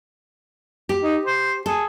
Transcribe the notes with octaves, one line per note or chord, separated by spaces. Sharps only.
G4
D#4
C5
G#4 A4